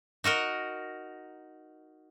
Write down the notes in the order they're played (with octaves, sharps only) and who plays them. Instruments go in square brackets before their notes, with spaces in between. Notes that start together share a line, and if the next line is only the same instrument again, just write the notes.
[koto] D#4 F#4 A#4 D#5